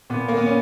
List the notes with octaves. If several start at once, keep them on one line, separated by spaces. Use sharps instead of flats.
A#2 B3
A#3
B3
C#4